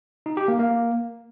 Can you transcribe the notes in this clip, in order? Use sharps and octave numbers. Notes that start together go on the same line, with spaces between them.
D#4
G4
A#3
A#3